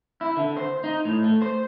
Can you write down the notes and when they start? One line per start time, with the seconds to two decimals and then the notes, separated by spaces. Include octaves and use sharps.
0.21 E4
0.37 D3
0.57 C5
0.84 D#4
1.05 A2
1.24 A3
1.42 C5